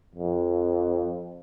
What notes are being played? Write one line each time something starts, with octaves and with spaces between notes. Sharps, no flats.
F2